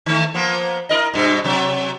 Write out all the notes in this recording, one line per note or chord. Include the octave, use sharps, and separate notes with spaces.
D#3 A3
F3 A#3 B3
E4 A#4 D#5
G2 B2
C3 F#3